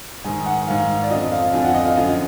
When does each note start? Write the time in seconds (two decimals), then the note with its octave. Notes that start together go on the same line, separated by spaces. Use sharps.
0.24 G#2 D#3 G#5
0.46 F#5
0.67 G#2 D#3 F5
1.03 D5
1.10 F2 D3 F3 D#5
1.32 F5
1.53 F2 D3 F3 G#5
1.64 F#5
1.74 D#5
1.85 F5
1.96 F#2 D3 F3 D#5